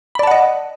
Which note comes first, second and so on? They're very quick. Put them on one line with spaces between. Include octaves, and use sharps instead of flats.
B5 D5 A5 F#5 D#5